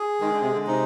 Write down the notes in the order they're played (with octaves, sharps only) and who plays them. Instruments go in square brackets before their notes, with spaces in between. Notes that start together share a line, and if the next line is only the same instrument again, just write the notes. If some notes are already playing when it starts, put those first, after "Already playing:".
Already playing: [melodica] G#4
[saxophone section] D#3 [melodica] G#3
[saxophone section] D3
C3
D3
[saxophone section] C3 [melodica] D#4